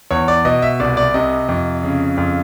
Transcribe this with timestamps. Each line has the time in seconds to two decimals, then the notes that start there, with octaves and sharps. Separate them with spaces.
0.11 E2 C#5
0.28 D5
0.45 B2 D#5
0.62 E5
0.80 C2 D5
0.97 D5
1.14 C3 D#5
1.49 F2
1.83 C#3
2.17 F2